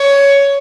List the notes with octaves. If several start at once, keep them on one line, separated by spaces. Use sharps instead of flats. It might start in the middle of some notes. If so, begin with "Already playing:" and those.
Already playing: C#5